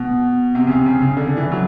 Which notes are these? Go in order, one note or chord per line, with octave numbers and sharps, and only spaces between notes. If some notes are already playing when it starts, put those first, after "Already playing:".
Already playing: B2
C3
C#3
C3
C#3
C#3
D3
E3
F#3